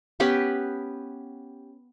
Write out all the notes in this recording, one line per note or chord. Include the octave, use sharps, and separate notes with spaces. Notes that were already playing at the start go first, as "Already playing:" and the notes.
B3 C#4 G4 B4